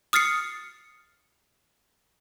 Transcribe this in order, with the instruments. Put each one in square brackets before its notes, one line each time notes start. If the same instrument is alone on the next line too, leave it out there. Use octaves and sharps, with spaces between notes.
[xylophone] D#6 F6 A6 C7 C#7